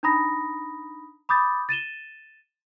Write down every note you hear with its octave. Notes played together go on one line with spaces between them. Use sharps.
D4 D#4 A#5 B5 D#6 A#6
B5 D6 D#6 G6 A6
A6 D#7 E7 G7